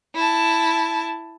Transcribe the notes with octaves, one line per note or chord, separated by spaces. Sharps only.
E4 A5